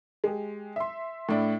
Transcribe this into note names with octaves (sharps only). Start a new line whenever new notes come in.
G#3 G4
E5 C6
A2 D4 E4